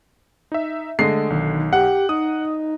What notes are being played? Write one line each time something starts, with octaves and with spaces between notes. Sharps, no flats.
D#4 E5
D3 G#3 A3 D#5 C7
B1 D#3
G4 F#5
D#4 D#6